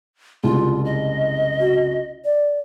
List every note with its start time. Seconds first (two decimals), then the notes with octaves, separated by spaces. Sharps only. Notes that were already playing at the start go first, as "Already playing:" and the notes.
0.43 F#1 C2 G#3 F4
0.85 D#5
1.60 F#4
2.25 D5